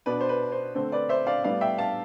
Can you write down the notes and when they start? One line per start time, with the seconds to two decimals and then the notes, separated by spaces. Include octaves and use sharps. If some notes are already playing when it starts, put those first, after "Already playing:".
0.06 B2 B3 D4 B4 D5
0.21 C5
0.29 B4
0.52 C5
0.75 D3 A3 C4 C5
0.92 B4 D5
1.09 C5 E5
1.27 D5 F5
1.44 A2 G3 B3 D5 F5
1.61 E5 G5
1.78 F5 A5